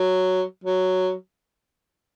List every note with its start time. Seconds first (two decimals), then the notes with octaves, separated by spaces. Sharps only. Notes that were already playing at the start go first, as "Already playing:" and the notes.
Already playing: F#3
0.64 F#3